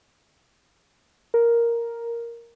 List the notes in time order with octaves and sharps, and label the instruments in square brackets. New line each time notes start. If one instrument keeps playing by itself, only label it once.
[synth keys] A#4